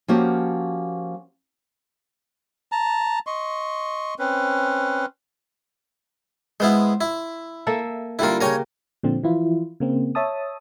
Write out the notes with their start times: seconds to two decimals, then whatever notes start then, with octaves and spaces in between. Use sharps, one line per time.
0.08 F3 A#3 C#4 F#4 G4 F#5
2.72 A5 A#5
3.27 D#5 C6 C#6
4.19 C4 C#4 B4
6.60 G#3 B3 E4 C5 F5
7.01 E4
7.67 A#3 A4 E5
8.19 D3 G3 A#3 E4 F4
8.41 C#3 G4 A#4 C#5 G#5 A#5
9.03 A#2 D3 F3 C4
9.23 E3 F3 E4 F4
9.80 C#3 A#3 C4
10.15 C#5 E5 A5 D#6